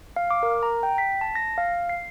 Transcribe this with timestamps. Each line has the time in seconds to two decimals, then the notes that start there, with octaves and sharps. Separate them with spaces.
0.16 F5
0.31 D6
0.43 A#4
0.63 A#5
0.83 G5
0.98 B6
1.21 A5
1.35 A#6
1.58 F5
1.89 C7